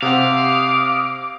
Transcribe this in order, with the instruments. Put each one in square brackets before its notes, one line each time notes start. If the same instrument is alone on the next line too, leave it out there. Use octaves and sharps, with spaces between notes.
[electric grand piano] C3 C5 F#5 [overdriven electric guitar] F5 [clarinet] D6 [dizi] D#6